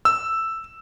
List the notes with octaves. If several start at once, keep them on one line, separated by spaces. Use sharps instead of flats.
E6